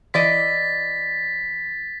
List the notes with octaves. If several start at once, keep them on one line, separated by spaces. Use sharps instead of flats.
E3 D5 D#5 A6 B6